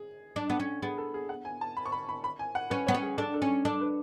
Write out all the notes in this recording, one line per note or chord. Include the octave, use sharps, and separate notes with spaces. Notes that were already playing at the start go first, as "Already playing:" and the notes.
Already playing: G#4
D4
B3
C#4
B3 G#4
A4
G#4
F#5
G#5
A5
B5
C#6
B5
B5
B5
G#5
F#5
C#4 B4
B3 C#5
C#4
G#4
D4 A4
A4
C#4
D4 A4
B4